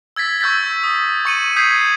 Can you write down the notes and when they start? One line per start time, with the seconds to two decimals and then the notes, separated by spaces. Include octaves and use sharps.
0.16 E6 G#6 A6 B6
0.41 C#6 E6 G6 A6 B6
0.83 D#6
1.25 C#6 C#7 D#7 F#7
1.56 D#6 G6 G#6 B6 C7